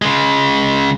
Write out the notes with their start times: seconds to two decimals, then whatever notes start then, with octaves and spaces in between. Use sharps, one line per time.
0.02 C#3 G#3